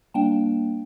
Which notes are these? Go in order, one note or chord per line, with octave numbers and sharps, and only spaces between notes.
G3 A#3 D4 G5 A5